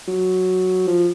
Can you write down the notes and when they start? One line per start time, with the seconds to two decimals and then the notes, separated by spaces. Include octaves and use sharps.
0.08 F#3
0.87 F3